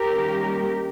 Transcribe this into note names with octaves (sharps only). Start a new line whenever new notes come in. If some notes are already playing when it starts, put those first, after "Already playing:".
Already playing: G4 A#4
D#3 G3 A#3 C#4